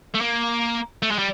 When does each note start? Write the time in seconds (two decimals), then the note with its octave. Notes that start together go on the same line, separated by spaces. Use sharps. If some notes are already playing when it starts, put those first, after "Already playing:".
0.14 A3
0.21 A#3
1.03 A3
1.11 G#3
1.19 G3